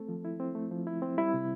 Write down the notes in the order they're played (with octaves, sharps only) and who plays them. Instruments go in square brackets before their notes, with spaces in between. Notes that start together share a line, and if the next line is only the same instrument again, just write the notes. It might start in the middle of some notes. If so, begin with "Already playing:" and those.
Already playing: [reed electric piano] A3 C4 A4
F3
E4
C4
A3
F3
E4
C4
G3 E4
C3